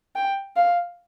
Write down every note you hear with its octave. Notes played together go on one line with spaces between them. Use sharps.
G5
F5